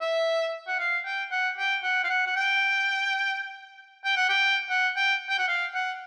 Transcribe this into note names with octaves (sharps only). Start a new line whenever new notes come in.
E5
F#5
F5
G5
F#5
G5
F#5
F5
F#5
F#5
G5
G5
F#5
G5
F#5
G5
G5
F#5
F5
F#5